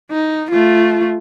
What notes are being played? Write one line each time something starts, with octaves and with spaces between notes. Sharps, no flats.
D#4
A3 F4